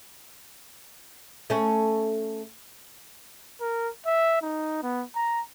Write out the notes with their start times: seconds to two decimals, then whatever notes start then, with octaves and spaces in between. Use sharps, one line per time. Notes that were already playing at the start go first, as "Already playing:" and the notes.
1.50 A3 C#4
3.61 A#4
4.06 E5
4.42 D#4
4.83 B3
5.15 A#5